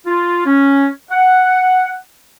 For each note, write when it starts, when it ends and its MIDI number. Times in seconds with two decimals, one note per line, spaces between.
0.07 0.41 65
0.46 0.87 61
1.11 1.96 78